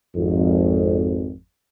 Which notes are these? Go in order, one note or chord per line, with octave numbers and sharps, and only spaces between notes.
G#1 F2